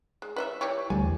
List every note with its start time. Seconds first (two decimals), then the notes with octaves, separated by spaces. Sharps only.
0.22 G#3
0.36 B4 D#5 E5
0.61 E3 G4 C#5
0.90 D2 G3 G#5
1.03 E2